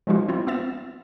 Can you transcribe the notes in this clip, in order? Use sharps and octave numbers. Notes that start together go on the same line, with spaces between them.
F3 G3 G#3 D#4 F4 F#4
C4 E4 F4
B3 C4 E5 A6 E7